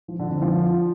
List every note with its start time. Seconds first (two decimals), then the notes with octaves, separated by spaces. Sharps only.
0.08 F3
0.19 D3
0.31 F2
0.42 F3